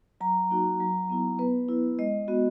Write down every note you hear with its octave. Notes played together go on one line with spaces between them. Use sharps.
F#3 A#5
A#3 D#4 F#4
F#3
B3 E4
B3 B4
E4
G#3 D#5
B3 F#4